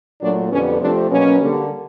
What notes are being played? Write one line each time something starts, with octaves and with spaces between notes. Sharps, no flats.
A#2 F#3 A3 D4
F2 D3 G3 B3 C#4
C3 F3 A3 C4 D4
B2 F#3 A#3 C#4
D3 G3 A#3